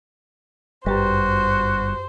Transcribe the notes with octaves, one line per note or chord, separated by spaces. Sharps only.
G1 F#2 G3 F#4 G4 B4 C5